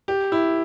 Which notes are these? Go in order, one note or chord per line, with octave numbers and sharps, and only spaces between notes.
G4
E4